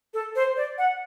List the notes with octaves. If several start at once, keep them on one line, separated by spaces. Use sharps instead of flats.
A4
C5
D5
F#5